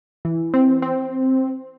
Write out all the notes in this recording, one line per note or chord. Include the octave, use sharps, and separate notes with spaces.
E3
C4
C4